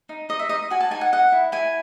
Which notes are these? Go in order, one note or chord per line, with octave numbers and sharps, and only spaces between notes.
D#4
D#4 D#5
E5
D#4 D#5
F#4 G#5
A5
D#4 G#5
F#5
D#5 F#5
E4
E4 G#5